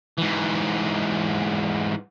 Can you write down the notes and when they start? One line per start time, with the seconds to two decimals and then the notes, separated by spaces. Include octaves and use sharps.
0.18 G#2 E3